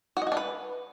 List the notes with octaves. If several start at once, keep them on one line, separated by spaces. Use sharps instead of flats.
F#4
D#5
F#4
D4
B4